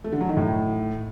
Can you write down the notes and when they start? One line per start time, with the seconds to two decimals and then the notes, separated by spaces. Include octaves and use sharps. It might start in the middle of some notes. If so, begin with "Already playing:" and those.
0.04 A3
0.12 D3
0.21 F#3
0.29 D#3
0.37 A2